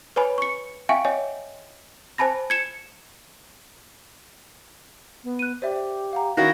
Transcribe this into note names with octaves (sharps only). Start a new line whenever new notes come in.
B4 C#5 G#5 B5
C#6 C#7
E5 F5 G5 G#5 C#6
C#5 D#5 G#5
C5 G#5 A5 B5 A#6
G#6 C#7 E7
B3
F#6 D#7
G4 C5 D5 E5
F5 F#5 A#5
D#3 C#4 E4 F#4 F5 A#6